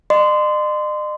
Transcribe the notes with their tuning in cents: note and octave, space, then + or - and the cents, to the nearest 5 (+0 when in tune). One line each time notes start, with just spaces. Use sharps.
D#5 -45 C6 -20